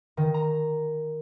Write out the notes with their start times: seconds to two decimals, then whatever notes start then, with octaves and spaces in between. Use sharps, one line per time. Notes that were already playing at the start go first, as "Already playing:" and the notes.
0.17 D#3
0.34 A#5